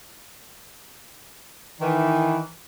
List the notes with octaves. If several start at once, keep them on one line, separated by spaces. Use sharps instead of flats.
D#3 E3